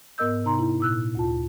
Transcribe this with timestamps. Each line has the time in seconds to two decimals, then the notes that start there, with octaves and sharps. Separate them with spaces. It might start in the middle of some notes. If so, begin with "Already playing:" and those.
0.18 G#2 B3 A#4 D#5 E6 G6
0.44 C3 D#4 A#5 C6
0.59 E4
0.80 A#2 E6 F#6
1.15 D2 F4 A5